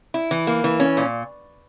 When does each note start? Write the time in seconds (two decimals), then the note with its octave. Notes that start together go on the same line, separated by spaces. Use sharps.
0.14 E4
0.31 E3
0.47 A#3
0.64 E3
0.80 C#4
0.97 A#2